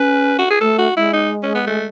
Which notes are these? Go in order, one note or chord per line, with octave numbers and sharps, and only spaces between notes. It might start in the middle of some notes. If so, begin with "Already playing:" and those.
Already playing: C#4 B4
F#4
G#4
A3 A4
F#4
G#3 E4
D#4
C#4
B3
A3